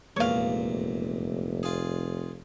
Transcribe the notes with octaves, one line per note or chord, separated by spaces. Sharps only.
F1 E2 A#2 G#3 A#3 C#5 F5
F4 G#4